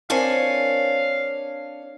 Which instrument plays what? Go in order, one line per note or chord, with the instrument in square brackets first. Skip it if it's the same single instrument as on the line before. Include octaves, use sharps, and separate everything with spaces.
[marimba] C4 A#4 C5 [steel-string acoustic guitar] D4 C#5 G#5 [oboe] F5